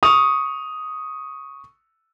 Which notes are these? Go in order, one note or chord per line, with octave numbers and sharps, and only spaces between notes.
C#6 D#6 F7